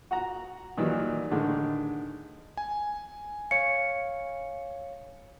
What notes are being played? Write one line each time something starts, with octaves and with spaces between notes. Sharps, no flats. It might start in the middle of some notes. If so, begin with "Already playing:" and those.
F#4 F#5 A#5
A#2 D#3 E3 F#3 G3
A2 D3 D#3 G#3
G#5
C#5 F5 C#7